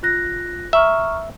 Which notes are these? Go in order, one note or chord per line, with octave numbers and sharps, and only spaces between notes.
F4 F#6 A#6
E5 A#5 C#6 F6